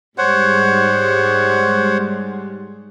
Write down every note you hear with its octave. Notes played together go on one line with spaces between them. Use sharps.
G#2 G3 G#3 C5 C#5 F#5